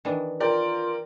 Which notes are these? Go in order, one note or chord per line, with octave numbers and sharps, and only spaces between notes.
D#3 E3 D4
F4 A#4 D5 G5